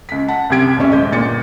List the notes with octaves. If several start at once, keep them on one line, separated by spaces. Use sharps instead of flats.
C#2 B6
F#5 A5
C2 F#2 C3 G4 G#6 D7
D#1 C#2 C3 C#4 E5
D#1 F#2 G#3 D#5 G6
G1 A#2 A6 C#7